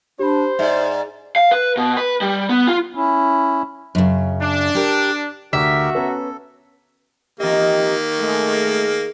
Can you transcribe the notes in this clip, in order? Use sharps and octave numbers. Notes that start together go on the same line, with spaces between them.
D4 G4 C5 B5
G#2 D5 E5
F5
B4
B2
B4
G3
B3
F4
C#4 E4
F#2 C#3
D4
G4 A#4
D2 F#4 G4 A#4 E5
B3 C#4 A4 A#5
E2 D#3 A#3 G4 D#5
G#3 A3